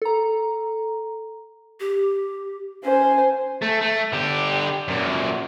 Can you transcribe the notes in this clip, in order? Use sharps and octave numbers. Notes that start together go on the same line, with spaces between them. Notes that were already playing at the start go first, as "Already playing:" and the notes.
A4 A#5
G4
C#4 C5 G#5
A3
A3
D3 G4
F#2 A#2